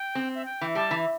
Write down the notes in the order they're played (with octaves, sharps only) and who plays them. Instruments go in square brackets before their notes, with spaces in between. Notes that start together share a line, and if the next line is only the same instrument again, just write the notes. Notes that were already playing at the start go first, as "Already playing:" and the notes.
Already playing: [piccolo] G5
[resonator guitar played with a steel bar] C4
[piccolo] E5
G5
[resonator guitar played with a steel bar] E3
[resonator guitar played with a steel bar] G3 [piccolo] A5
[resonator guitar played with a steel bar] E3